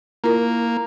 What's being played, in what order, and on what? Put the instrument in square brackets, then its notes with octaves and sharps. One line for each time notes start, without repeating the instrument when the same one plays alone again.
[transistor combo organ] A#3 [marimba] E4 F4 A#4